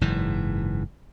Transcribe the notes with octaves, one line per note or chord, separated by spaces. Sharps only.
F#1 G#2 E3